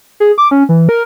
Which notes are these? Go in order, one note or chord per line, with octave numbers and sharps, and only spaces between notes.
G#4
D6
C#4
E3
A#4